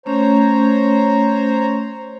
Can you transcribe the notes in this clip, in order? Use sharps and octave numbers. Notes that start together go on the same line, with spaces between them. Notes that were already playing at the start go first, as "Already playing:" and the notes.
A3 C#4 C5 C#5 A#5